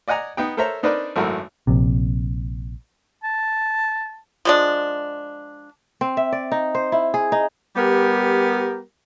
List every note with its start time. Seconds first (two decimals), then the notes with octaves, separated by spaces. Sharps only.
0.08 D5 D#5 F#5 G#5 A#5
0.37 B3 D#4 G5
0.57 A4 A#4 C5 C#5 E5 A#5
0.83 C4 D4 D#4 A#4 B4 D5
1.16 G#1 F#2 A3 E4 F#4 A#4
1.67 A#1 C3
3.24 A5
4.45 F3 G#3 D4
6.01 C4
6.17 E5
6.32 D5
6.52 D#4
6.75 C5
6.92 E4
7.14 G#4
7.32 D#4
7.76 G3 B3 G4 A#4